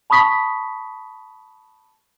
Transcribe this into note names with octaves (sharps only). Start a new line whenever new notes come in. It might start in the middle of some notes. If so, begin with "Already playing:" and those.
A5 B5 C#6 D#6 B6